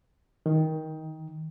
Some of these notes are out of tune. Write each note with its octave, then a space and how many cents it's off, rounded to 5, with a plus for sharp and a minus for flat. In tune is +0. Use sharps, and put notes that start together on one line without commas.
D#3 +20